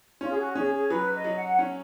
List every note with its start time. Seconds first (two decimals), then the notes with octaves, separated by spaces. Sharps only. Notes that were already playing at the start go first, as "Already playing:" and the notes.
0.21 C#4 F4
0.31 G#4
0.38 F#4
0.55 C#4 G#4
0.73 G#4
0.90 F#3 B4
1.13 D#5
1.25 F#3
1.36 F#5
1.59 C#4